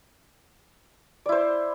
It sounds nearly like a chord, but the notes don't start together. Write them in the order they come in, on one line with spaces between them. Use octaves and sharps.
D5 E4 C5